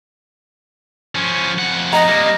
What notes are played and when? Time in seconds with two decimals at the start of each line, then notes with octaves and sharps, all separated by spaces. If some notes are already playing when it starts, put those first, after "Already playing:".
1.15 F3 C#4
1.59 F2 F#5
1.93 D#5 A#5
2.08 G3 A#3